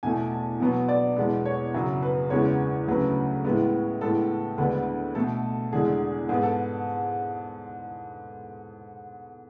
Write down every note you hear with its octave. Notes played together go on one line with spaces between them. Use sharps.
E2 B2 A3 G#5
A5
B2 F#3 B3
D5
E2 B2 G#3 B3
C#5
F#2 C#3 F#3
B4
E2 C#3 G#3 B3 C#5
D2 C#3 F#3 A3 B4
A2 G#3 B3
A2 G#3 B3 A4
D2 D3 G#3 B3 B4
B2 A3 A4
E2 D3 G#3 G#4
G#2 G#3 B3 G#4
A4